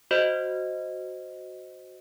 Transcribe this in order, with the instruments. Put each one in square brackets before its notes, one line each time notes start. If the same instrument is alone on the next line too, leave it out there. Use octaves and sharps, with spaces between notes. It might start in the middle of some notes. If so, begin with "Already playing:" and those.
[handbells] F#4 C5 D#5